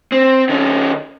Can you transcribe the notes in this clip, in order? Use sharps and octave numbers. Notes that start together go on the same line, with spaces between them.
C4
D#3 C#4